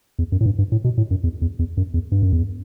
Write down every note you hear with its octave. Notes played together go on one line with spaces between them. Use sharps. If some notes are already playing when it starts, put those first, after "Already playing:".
E2
F#2
A2
G2
G2
A2
B2
A2
F#2
E2
E2
E2
F#2
E2
G2
F#2
E2